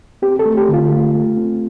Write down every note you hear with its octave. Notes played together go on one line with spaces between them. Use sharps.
C4 G4
A4
A3
G4
D3
F4
A3
A3
C4